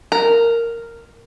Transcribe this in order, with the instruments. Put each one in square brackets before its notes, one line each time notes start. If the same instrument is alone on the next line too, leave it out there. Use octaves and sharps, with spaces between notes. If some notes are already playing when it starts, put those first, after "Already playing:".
[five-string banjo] A#4